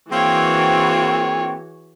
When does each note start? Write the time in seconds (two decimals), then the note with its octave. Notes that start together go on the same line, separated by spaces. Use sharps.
0.11 E3 A#3 C4 F#4 G#4 C#5 G5